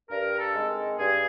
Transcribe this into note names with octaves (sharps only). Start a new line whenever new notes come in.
G2 A#4
A4
D#3 G#3 C4
G2 G#4